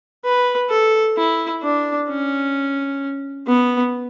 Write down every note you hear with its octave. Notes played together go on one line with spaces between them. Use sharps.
B4
A4
E4
D4
C#4
B3